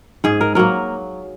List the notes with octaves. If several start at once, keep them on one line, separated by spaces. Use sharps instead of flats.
G#2 G#4
A#4
F#3 A#3 A#4